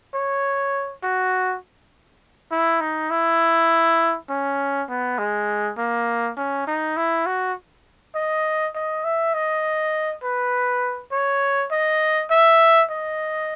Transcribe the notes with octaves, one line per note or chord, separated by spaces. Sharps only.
C#5
F#4
E4
D#4
E4
C#4
B3
G#3
A#3
C#4
D#4
E4
F#4
D#5
D#5
E5
D#5
B4
C#5
D#5
E5
D#5